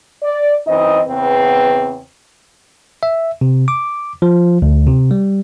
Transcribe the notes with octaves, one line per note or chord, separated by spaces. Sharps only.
D5
F#2 E3 C4 D#4 D#5
E2 C#3 B3 C4 B4
E5
C3
D6
F3
D2
C3
G3